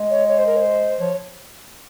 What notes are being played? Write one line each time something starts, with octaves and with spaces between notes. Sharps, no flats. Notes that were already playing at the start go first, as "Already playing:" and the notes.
Already playing: G#3
C#5
C#5
C5
A#4
C#5
C5
F3 C#5